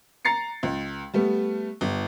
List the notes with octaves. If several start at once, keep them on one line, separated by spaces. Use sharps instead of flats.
A#5 A6 C7 C#7
C#2
G3 A3 B3
G1